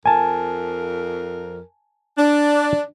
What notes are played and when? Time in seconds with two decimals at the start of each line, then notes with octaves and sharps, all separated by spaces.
0.06 F2 A#4 G#5 A5
2.18 D4